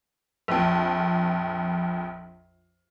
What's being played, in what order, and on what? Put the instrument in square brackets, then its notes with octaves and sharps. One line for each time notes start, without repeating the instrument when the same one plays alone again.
[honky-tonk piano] A#1 F2